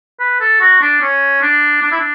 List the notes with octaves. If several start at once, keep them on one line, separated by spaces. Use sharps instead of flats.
B4
A4
F#4
D4
C#4
D4
D4
E4
D4